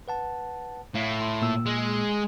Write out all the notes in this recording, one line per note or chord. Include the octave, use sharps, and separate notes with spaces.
B4 F#5 A5
A2 F5
C6
A#2 A#3 E6
G#3